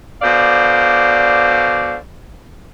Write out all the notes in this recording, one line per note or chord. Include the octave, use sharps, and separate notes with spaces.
B2 D3 C5 D5 F5